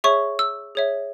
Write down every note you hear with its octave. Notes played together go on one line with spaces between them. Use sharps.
G#4 C#5 E5 C#6
E6
G#4 C#5 E5